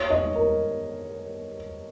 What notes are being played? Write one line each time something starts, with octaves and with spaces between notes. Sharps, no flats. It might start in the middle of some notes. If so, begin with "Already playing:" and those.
Already playing: C#5
D#5
A#4